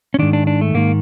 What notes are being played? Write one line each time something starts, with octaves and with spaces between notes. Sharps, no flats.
C#4
G#2 D#3 D4
D4
D4
A3
G#2 D#3 A#3